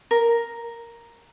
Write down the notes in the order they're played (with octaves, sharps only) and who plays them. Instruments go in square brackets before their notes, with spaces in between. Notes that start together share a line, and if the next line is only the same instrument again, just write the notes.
[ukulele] A#4